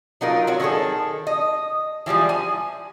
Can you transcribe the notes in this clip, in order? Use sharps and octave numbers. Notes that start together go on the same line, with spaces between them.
F#3 D#4 F4 A#4
F#3 C4 C#5
D#3 C#4 D4 G#4 A4
D#5
E3 F3 G3 G#3
G#5